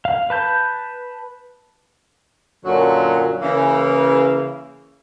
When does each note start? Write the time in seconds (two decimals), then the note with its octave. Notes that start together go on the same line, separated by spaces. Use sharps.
0.05 F5
0.30 B4 A5 G6
2.64 F#2 A#2 D3 F#3
3.41 C#3 E3 A#3